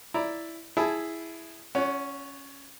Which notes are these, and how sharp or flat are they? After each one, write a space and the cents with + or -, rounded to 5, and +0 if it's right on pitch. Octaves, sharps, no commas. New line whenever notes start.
E4 +0 D5 +0 A#5 +0
E4 +0 G#4 +0 A5 -15
C#4 +0 C#5 +45 F#5 +0